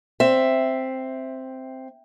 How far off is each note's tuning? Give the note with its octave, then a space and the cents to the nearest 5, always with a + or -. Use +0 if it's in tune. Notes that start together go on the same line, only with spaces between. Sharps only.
C4 +0 E5 +0